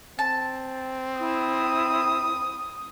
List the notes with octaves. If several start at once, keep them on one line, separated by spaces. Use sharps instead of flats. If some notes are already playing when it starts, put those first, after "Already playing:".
C4 A5
E4 D#6